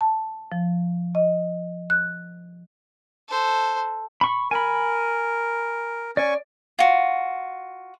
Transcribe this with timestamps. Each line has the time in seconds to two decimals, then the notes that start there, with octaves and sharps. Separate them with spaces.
0.01 A5
0.52 F3
1.15 D#5
1.90 F#6
3.28 A4 C5
4.21 B5 C#6
4.51 A#4 G#5 B5
6.17 C#4 D5 G#5 C#6
6.79 F4 F#4